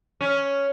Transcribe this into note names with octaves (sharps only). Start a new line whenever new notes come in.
C#4